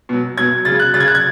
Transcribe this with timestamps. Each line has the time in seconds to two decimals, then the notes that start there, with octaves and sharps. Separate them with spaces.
0.09 B2 F#3
0.37 B2 F#3 G#6
0.65 C#3 F#3 A6
0.79 F#6
0.94 C#3 F#3 A6
1.00 G#6
1.07 F#6
1.15 G#6